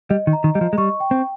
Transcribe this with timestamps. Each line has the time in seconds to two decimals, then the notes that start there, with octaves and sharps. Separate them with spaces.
0.10 G3 D#5
0.27 D#3
0.33 A#5
0.44 D#3
0.55 G3 D#5
0.61 F3
0.73 G#3
0.78 G3 C#6
1.00 G5
1.11 C4